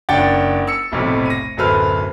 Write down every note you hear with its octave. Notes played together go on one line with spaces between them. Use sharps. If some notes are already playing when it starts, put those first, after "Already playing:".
F#1 C#4 D4 F#5 G5 A6
E6 C#7
F1 B1 A2 C3
A#6 D#7
D1 F#2 A4 B4 C5 F6